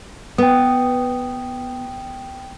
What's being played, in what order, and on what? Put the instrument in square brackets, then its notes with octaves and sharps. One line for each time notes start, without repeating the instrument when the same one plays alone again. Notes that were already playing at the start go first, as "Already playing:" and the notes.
[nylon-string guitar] B3 [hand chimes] G5 D#6